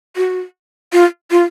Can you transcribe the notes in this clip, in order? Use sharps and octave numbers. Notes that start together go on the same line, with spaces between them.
F#4
F4
F4